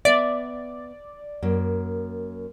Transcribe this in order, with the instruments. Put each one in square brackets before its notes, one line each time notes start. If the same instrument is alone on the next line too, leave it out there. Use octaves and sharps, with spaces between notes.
[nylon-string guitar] B3 E5 [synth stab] D5
[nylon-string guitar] F#2 A#3